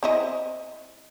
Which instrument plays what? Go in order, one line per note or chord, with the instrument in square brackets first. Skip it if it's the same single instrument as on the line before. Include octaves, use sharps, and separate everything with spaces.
[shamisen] C4 E4 D#5